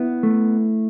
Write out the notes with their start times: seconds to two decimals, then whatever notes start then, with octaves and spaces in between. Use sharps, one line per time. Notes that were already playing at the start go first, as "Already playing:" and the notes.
Already playing: B3 E4
0.23 A3